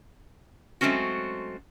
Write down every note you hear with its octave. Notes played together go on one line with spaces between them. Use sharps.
F#3 G#3 A3 C4 C#4 F#4